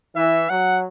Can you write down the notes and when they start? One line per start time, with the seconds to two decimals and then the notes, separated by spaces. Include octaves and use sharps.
0.16 E3 E5
0.50 F#3 F#5